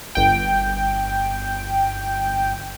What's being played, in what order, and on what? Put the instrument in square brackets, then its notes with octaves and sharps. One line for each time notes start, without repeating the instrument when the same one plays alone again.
[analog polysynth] G1 G5